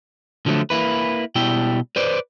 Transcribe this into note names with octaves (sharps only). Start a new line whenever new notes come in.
D3 F3 F#3 G#3 A3
A#3 E4 B4
B2 G3 E4 G5
B4 C5 D5